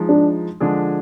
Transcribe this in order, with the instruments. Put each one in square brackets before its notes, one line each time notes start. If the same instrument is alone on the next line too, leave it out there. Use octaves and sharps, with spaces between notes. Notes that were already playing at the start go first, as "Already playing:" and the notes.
Already playing: [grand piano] F3 G#3 D#4
[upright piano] D4
[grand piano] D3 F3 G#3 D4 G#4